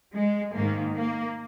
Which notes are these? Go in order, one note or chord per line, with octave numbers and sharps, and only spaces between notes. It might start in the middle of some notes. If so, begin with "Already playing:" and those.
G#3
G#2 D#3 A#3
A#3